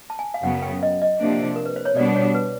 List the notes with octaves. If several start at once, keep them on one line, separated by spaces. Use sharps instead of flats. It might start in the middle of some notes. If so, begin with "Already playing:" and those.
A5
G#5
F5
F#2 C#3 F#3 B3 F#5
G5
D#5
D#5
C3 F3 A#3 D4
A#4
B4
C5
C#5
B2 G3 B3 D4 D5
C#5
B4